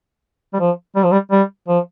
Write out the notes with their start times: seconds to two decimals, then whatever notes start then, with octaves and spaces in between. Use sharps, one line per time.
0.54 G3
0.60 F3
0.96 G3
1.04 F3
1.12 G3
1.32 G3
1.68 F3